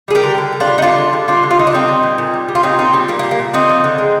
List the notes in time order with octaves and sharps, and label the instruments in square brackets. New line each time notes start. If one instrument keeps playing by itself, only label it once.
[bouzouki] G3 G#4
G4 A#4
D3
D3
G3
D4 F4
G3
D#4
D3 D4 F4
D3
G3
G3 D4 F4
D3
F4
D3 D#4
D4
G3 C4 D#4
G3
A#2
A#2
G3
G3
F4
A#2 C4 D#4
A#2 C4 D#4
G3 C4
G3 A#3
A#3
A#2
A#3
A#2
D3 C4 D#4
F3
D3
G#3